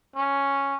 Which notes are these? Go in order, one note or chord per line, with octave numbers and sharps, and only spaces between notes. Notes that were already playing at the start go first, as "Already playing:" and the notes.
C#4